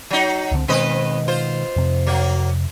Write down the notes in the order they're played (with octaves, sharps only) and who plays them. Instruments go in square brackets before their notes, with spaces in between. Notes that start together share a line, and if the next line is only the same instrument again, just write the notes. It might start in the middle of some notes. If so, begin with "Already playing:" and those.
[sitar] F#3 D#4
[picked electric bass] C#2 D3 C4
[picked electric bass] B2 D#3 G#3 [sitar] C4 B4 D#5
[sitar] F4 C5
[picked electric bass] F2 C3
[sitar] F#3 A#3